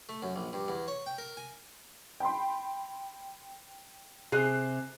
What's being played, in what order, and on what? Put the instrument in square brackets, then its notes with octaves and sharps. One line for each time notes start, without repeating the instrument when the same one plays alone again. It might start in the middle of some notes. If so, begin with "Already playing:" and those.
[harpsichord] A3
F#2
A#1
G2
E2
C#5
G5
A#4
G#5
[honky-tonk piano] G5 B5 C6
[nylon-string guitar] C3 [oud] G#4 [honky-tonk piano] F#6 C7